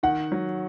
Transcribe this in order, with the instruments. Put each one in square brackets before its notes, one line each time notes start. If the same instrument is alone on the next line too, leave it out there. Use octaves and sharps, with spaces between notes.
[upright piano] D#3 [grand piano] F#5
[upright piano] F#3